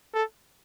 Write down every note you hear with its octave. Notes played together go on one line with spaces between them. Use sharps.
A4